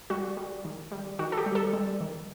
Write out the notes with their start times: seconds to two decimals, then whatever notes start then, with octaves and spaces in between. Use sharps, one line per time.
0.10 G3 F#4
0.37 G3
0.65 D#3
0.92 G3
1.19 D#3 F#4
1.32 A4
1.37 G4
1.46 G3
1.55 A4
1.73 G3
2.01 D#3